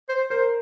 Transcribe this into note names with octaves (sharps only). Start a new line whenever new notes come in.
C5
A#4 C5